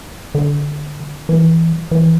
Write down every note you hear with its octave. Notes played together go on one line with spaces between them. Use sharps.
D3
E3
E3